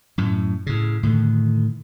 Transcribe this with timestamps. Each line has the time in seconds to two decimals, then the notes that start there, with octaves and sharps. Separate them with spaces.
0.18 F#2 A2
0.66 A2 C#3
1.03 A2 D3 D#3